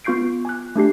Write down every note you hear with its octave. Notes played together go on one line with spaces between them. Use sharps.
B3 F4 C#6 G6 C7 D7
G#5 D6 F#6
A3 D4 G4 C7